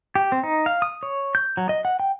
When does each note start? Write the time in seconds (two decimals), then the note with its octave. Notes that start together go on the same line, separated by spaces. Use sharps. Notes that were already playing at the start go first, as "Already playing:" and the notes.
0.15 G4
0.32 C4
0.43 D#4
0.66 F5
0.82 D#6
1.03 C#5
1.35 G6
1.57 F#3
1.69 D#5
1.85 F#5
2.00 G5